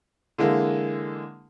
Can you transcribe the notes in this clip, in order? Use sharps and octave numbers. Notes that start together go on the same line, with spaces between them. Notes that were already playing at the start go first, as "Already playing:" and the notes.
D3 E3 G#3 A#3